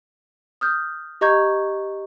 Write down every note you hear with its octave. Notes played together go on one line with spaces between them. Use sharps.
D#6 F6 G6
G4 D#5 A#5 C#6 G6 G#6